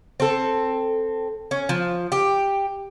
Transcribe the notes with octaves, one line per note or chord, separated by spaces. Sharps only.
C4 A4
C#4
F3
G4